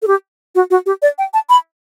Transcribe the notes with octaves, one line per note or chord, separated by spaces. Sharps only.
A4
G4
F#4
F#4
G4
D5
G5
A5
B5